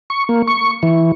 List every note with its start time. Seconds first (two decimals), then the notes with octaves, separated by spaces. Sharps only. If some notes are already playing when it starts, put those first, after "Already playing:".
0.10 C#6
0.29 A#3
0.47 C#6
0.83 E3